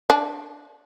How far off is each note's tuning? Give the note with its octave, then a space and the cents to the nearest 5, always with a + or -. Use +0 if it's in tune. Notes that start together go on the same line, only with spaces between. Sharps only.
D4 +0 A5 -45